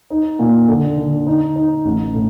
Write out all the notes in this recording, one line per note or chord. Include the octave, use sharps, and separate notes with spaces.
D#4
A#2
D3
D3
D#4
D#4
A1
A2